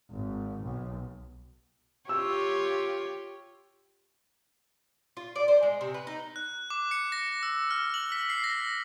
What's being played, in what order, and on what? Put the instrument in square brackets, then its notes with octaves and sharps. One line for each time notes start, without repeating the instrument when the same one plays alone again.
[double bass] G#1
B1
[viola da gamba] F4 G4 C#5 [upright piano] E6
[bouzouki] F4
D5
C5
G#3
C3
B4
D#4
[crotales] F#6
D6
C#7
A#6
E6
F6
F#7
B6
C7
A#6